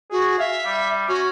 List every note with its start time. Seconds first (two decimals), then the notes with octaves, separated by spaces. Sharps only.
0.12 F#4 G#4
0.39 E5 F5
0.65 G3
1.08 C#4 F#4